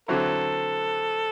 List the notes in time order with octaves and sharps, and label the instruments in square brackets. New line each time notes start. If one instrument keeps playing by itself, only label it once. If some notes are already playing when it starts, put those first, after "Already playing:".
[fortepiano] D3 F#3 C4 E4 [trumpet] A4